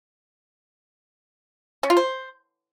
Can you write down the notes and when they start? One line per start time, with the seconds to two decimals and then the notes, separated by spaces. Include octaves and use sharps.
1.83 C#4
1.90 F4
1.97 C5